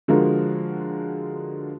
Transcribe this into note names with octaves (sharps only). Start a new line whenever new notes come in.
D3 F3 G#3 F4 F#4 A#4